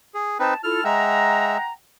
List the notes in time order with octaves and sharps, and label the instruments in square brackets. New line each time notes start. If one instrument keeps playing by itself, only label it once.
[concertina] G#4
[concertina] C4 D#4 B4 [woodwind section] A5
[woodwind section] E4 F4 A4 [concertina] F6
[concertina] G#3 E5 [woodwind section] F#5 G5 A#5